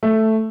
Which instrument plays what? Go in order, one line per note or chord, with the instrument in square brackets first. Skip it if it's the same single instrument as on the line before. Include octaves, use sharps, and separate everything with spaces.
[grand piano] A3